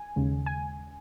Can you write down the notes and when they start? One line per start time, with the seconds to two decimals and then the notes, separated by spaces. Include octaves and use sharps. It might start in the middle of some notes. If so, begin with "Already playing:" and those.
Already playing: G#5
0.16 D#2 C#3 G#3
0.46 G#5